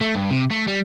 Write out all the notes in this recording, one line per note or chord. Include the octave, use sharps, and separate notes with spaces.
A3
G2
C3
A3
G3